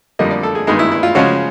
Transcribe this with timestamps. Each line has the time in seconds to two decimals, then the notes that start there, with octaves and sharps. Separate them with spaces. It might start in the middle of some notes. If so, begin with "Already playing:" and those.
0.19 F2 D3 G3 A#3 D#5
0.31 D5
0.43 A4
0.55 G#4
0.67 G2 D#3 G#3 B3 D#4
0.79 E4
0.92 E4
1.03 F4
1.15 C#3 F3 G#3 C#4 F#4